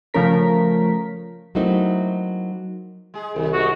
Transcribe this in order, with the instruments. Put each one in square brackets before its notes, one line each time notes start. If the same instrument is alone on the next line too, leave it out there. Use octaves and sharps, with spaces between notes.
[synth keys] C#3 F3 A3 C#4 A#4 B6
[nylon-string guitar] F#3 A3 A#3 C4 D#4 E4
[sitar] G#3 G#4
[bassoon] C2 [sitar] D#3 G#3
[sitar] G#3 A#3 D#4 [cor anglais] F#4